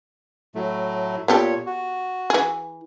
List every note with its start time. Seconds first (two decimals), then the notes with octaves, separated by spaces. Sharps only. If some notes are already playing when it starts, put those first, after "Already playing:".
0.55 A2 F#3 A3
1.28 A#2 B3 G4 A4 C#5
1.66 F#4
2.30 E3 G#4